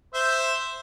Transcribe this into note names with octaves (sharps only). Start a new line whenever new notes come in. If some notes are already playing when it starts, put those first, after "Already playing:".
C5 E5